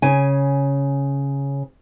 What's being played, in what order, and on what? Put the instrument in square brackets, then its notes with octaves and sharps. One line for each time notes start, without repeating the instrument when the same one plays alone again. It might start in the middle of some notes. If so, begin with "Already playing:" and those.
[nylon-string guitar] C#3 G#5